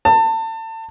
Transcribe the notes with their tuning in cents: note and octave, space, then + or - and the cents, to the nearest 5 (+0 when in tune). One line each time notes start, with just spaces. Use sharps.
A5 +30